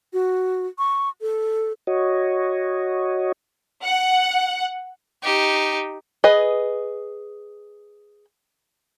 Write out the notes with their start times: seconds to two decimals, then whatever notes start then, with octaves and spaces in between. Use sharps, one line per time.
0.13 F#4
0.78 C#6
1.21 A4
1.87 F#4 C#5 D#5
3.84 F#5
5.24 D#4 G4
6.24 G#4 B4 D#5